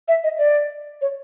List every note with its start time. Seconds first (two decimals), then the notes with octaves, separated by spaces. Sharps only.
0.08 E5
0.24 D#5
0.38 D5
1.02 C#5